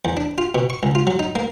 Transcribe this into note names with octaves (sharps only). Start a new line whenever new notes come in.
E2
D4
F4
B2
C#6
C#2
F4
F#3
D#4
A#3